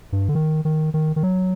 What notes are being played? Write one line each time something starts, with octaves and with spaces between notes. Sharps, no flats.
G2
D3
D#3
D#3
D#3
D#3
F#3